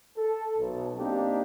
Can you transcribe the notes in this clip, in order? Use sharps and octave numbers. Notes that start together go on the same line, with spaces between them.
A4
B1
A#3 C4 D4 D#4 G4